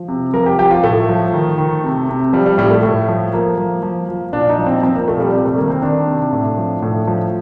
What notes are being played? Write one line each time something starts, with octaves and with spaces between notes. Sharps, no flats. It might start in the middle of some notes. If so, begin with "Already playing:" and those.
Already playing: F3
C3
F3 A#4
G4
F3 G4
F4
A2 A3
F3
D#3
D#3
C3
C3
F3 G3
G3
A2 G3
A3
A2
F3
F3 A#3
F3
F3
F3
A#2 D4
D#4
F3
C4
F3 C4
A#3
A#2 A3
G3
C3 G3
A3
D#3 A#3
C4
D#3 D4
C3
A2
F3
A2
F3